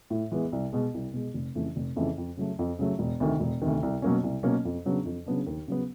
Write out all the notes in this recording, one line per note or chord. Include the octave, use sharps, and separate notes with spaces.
A2
E3 G#3 B3
C2
B2 G#3
C2
B2 G#3
F1
F2 C#3 E3 A3
F1
F2 C#3 E3 A3
F2
C#3 F#3 A3
F2
C#3 F#3 A3
E1
D2 C3 D#3
E1
D2 C3 D#3
C2
B2 F#3 A#3 C#4
C2
B2 F#3 A#3 C#4
F2
C#3 F#3 B3 D4
F2
C#3 F#3 B3 D4
D#2
C#3 F#3 B3